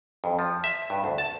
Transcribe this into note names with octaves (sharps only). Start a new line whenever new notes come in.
F2
F3
E5
G2
D2
A5